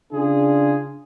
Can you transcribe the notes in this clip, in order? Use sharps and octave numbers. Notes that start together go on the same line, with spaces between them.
C#3 D4 F4 G#4